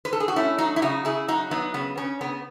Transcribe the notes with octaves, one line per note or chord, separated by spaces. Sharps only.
B4
A4
G#4
F#4
A3 C#4 E4
F#3 D#4 F#4
E4
C#3 D#4 F#4
C#3 E4 G#4
F#3 D#4 F#4
F#3 B3 D#4
C#3 B3
C#3 C#4
C#3 B3